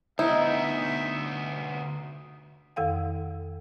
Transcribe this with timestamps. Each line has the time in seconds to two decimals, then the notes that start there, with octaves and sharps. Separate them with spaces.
0.19 D2 B3 D#4 E4 E5
2.76 F2 D#3 A4 F5 G5